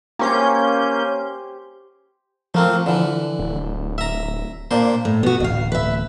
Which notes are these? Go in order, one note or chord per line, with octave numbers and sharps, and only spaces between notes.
A#3 C#4 G4 C5 G#5 G6
F3 A3 A#3 C4
D3 E3
D1
E5 A#5
A#2 A#3 D4 C5
A2
B2 B3 F#4
D1 A1 D#5 F5
B4 E5